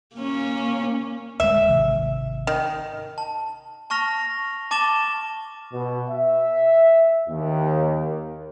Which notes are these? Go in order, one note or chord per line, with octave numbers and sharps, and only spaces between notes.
A#3 C#4
D1 G#3 E5
G#1 C3
D#3
A5
A5 C#6 F6 A#6 F7
A5 D6 A6 E7 G7
B2
E5
D#2